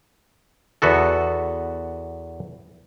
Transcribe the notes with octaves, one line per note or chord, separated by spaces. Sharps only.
E2 B3 F#4 A4